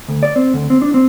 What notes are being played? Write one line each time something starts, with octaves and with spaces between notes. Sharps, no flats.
D2
D5
C4
D2
C4
D4
C4